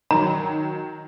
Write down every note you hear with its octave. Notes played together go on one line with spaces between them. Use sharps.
D#3 F#3 A#5